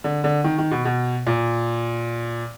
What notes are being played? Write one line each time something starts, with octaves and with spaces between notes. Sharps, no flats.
D3
D3
D#3
D#3
B2
B2
A#2